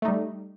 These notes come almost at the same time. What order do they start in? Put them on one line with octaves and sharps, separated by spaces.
A3 D#4 G3